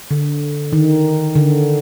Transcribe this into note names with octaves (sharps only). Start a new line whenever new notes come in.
D3
D#3
D3